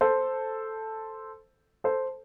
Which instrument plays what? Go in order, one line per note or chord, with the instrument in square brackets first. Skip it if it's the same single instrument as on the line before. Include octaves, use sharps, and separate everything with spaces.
[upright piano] A4 C5
A4 C5